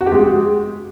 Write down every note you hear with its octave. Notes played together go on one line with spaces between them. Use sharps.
F#4
G4
G#3